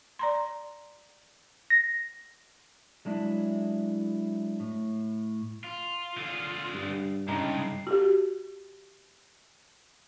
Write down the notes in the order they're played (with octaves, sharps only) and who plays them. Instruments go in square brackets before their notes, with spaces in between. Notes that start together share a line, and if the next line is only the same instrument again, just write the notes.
[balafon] D5 A#5 C6
[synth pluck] A#6
[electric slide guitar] F#3 G#3 D4 E4
A2
[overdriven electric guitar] F4
[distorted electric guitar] D3 G#4
[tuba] G2
[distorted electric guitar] C2 G#3 [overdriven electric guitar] G2 [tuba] C#3 [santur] D#4
[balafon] F#4 G4